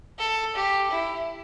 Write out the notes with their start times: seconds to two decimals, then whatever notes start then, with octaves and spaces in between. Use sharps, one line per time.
0.19 A4
0.55 G4
0.91 E4